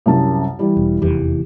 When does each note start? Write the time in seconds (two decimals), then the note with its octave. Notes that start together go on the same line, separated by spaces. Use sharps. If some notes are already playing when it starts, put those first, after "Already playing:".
0.06 C2 F#2 A5
0.59 E3 G3
0.77 E1
1.02 F1 E2 E3 G4